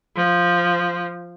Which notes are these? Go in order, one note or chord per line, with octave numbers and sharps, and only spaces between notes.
F3